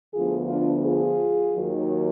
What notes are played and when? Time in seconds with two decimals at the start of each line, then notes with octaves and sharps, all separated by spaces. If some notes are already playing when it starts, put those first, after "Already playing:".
0.14 D2 D3 F3 B3 F4 G#4
0.49 D4 F4
0.83 F4 G#4
1.53 D#2 D#3 F#3